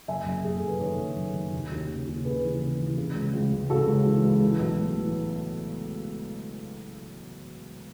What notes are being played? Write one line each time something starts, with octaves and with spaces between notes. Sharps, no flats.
F#1 E5 G#5
F#1
F#1 G#4
A4
F#1
B4
D#3 A4 C#5
F#1
F#1
D#3
D#2
D#2
C#3
D#2
C#3 G#4 B4
E3
C#3
E3
C#3
C#2
C#2
C#2
C#3 F#4 A4
C#2
E3
C#2
E3
B1
A2
E3